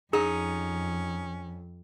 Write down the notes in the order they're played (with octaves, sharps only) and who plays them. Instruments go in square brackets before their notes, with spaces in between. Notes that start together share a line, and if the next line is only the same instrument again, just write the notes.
[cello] F2 [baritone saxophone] C#4 [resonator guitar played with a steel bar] D#4 [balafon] G#4